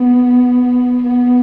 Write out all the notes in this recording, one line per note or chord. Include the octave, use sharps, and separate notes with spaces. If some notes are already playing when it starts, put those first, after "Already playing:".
Already playing: B3
B3